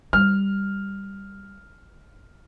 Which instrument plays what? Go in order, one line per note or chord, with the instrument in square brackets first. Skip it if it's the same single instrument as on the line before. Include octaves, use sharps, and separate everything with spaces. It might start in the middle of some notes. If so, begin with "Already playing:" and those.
[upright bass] G3 [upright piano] F6